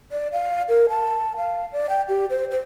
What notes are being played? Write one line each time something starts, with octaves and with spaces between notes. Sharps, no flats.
D5
F5
A#4
A5
F5
D5
G5
G4
C5
C5